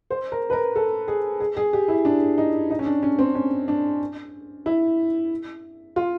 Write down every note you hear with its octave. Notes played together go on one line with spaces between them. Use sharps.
C5
A#4
B4
A#4
A4
G#4
G#4
G#4
G4
E4
D4
D#4
D#4
C#4
D4
C#4
C4
C#4
D4
E4
F4